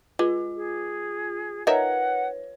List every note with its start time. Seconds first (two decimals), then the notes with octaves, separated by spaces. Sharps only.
0.19 G#3 F4
0.55 G#4
1.67 D#4 A#4 B4 C#5 E5 F#5